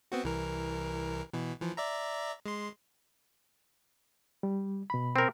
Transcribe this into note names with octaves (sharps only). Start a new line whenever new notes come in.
B3 C4 F#4
C2 E3 A#4
B2 E3
E3 F3
D5 E5 A#5
G#3 C6
G3
B2 B5
C4 A#4